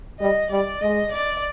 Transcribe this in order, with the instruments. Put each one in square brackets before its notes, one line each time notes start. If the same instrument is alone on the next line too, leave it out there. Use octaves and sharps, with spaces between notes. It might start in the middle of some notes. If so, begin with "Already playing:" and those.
[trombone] G3 [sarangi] D#5
[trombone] G3 [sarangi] D5
[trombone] G#3 [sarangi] D#5
[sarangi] D5